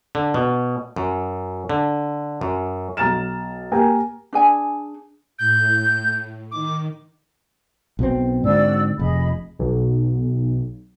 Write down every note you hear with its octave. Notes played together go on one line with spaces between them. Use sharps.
D3
B2
F#2
D3
F#2
B1 A#5 F6 A6 E7
A#3 G4 A#4 G5 G#5
D4 G#4 G#5
A2 G6
D#3 D6
B1 B2 C4
G#2 D3 C4 F#4 D5 E6
F1 G#4 D#5 B5
B1